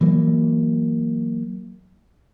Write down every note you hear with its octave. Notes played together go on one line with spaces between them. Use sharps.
E3 F#3 A#3